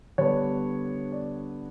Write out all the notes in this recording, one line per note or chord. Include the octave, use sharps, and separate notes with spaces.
D3 G3 B3 D4 C#5
D5